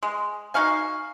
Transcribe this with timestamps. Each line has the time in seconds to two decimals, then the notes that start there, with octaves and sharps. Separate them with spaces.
0.03 G#3
0.54 D#4 F#4 F5 G#5